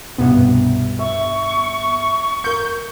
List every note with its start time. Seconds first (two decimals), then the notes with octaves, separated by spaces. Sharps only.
0.18 C2 G2 B2 B3
0.99 E5 C#6
2.44 A#4 G6 C#7